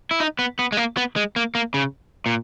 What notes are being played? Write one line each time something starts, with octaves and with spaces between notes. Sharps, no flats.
E4
D#4
B3
B3
G#3
A#3
B3
G#3
A#3
A#3
C#3
A#2